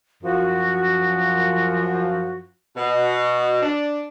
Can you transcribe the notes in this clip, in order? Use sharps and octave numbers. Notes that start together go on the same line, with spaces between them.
F#2 F3 F#4
B2
D4